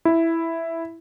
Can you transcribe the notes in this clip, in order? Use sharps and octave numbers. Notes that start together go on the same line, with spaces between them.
E4